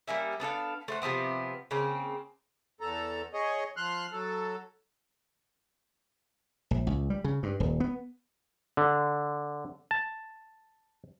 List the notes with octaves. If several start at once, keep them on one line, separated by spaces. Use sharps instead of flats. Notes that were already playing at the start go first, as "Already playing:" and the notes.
G3 A#3 C#4 E5
B3 D4 A4 F5
A3 C5 F#5
C3 F3 B3 C4
C#3 A#3 C4
E2 A4 A#5
G#4 C#5 D#5
F3 C6 F6 F#6
F#3 A4
A#1
C#2
G3
C#3
G2
D#1
B3
D3
A5